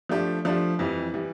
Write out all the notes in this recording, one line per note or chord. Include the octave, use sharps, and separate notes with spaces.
F3 A3 D4 G4
F3 A3 D4 G4
F2 E3 G3
E3 G3